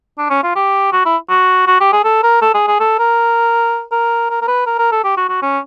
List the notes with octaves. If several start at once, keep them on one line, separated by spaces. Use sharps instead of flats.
D4
C#4
F4
G4
F#4
E4
F#4
F#4
G4
G#4
A4
A#4
A4
G#4
G#4
A4
A#4
A#4
A#4
A#4
B4
A#4
A#4
A4
G4
F#4
F#4
C#4